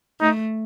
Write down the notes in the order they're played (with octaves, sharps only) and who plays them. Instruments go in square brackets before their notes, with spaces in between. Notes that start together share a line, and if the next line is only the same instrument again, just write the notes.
[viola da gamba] A3 [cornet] D#4